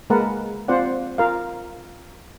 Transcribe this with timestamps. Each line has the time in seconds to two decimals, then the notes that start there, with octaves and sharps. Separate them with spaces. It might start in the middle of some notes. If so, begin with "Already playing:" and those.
0.10 G#3 A#3 A#4 B4 F#5 A5
0.68 C4 F4 C5 D5 F#5
1.18 F4 A#4 F5